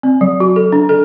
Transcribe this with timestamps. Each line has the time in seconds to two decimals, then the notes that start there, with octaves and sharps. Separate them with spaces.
0.03 C4
0.21 F#3
0.40 F#4
0.56 A4
0.72 D4
0.89 A4